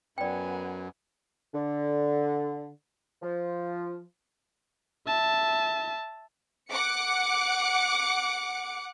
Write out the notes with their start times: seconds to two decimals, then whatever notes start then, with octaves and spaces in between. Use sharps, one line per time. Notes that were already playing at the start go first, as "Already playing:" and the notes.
0.18 F#2 B3 D5 G5 G#5
1.54 D3
3.22 F3
5.07 E5 A5
6.72 F#5 D6 C#7